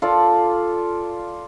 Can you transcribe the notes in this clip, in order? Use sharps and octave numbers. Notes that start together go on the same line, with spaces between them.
F4 A4 D5